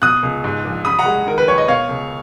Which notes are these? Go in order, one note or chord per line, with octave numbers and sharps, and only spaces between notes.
B2 D#6 F#6
C#2
G#2
A#1
C#3 B5 D#6
F#5 A#5
G#3
D#3 A#4
B4
D#2 C#5
D#5
B2 C#5 F5
C#2